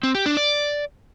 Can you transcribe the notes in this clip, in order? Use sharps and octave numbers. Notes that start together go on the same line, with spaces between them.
C4
G4
D4
D5